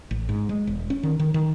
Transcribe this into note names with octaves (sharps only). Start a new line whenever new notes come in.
A1
G#2
G#3
E1
C#4
D#3
D#3
D#3